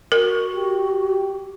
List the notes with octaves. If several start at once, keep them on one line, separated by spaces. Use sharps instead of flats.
F#4 A#4
G4